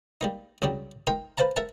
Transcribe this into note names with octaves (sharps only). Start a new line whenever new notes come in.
G3 A#3 D#4
C2 C#3 F#3 G3
D#4 A#4 G5 C6
B4 C5 F5 A5 A#5
A#4 E5 F#5 A5